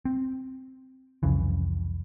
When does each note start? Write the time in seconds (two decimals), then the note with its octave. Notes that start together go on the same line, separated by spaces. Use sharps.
0.05 C4
1.23 C2 F2 C#3 E3